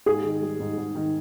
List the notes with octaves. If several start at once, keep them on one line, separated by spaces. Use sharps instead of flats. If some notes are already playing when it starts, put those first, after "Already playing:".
G#2 G#4
D#3
G3
G#2
G#2
D#3